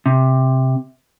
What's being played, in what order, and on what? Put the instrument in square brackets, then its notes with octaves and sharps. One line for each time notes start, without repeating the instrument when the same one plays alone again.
[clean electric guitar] C3